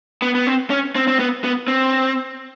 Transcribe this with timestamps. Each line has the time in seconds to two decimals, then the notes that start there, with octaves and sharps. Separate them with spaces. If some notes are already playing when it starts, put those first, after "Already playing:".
0.22 B3
0.35 B3
0.47 C4
0.70 C#4
0.95 C4
1.07 C4
1.19 B3
1.44 B3
1.68 C4